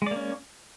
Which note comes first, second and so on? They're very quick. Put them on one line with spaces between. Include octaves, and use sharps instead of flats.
G#3 D5 A#3 C#4